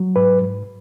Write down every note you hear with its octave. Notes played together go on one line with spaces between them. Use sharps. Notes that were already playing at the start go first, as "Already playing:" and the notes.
Already playing: F#3
G#2 B4
G#2